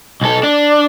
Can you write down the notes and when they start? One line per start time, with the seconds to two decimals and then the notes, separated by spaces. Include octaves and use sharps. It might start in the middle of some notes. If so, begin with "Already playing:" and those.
0.21 B1 A4
0.43 D4